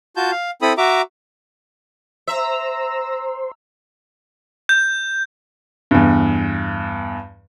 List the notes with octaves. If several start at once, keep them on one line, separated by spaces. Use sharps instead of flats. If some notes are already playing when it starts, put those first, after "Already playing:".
F4 F#4 A5 G6
F5
C4 E4 A4 B5 D#6
F#4 E5 A#5 D6
C5 E5 A#5 E6
G6
E2 G2